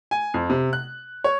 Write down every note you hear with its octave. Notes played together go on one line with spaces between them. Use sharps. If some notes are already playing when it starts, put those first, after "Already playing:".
G#5
F2
C3
F#6
C#5